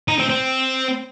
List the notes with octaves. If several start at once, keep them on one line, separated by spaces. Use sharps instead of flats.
D#4
C4
C4